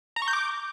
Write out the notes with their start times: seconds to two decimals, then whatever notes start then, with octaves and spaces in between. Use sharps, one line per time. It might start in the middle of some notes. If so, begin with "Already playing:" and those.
0.16 A#5
0.22 C#6
0.28 G6
0.33 D6